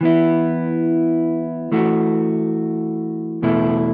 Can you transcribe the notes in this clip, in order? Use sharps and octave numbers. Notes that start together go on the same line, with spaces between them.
E3 B3 E4
E3 A3 F#4
E2 B2 A3 E4